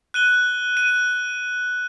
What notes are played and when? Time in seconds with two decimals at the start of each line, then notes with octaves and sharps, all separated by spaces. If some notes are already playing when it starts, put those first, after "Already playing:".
0.14 F#6 D#7 G7
0.77 D#7